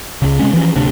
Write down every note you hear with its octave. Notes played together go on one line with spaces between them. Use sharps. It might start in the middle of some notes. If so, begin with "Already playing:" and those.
C#2 C#3
C3 G#3 C#4
E3 F3 A#3 C#4
D1 D2 C3 D4